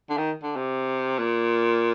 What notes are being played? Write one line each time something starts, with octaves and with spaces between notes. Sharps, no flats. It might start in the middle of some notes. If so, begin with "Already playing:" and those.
D3
D#3
D3
C3
A#2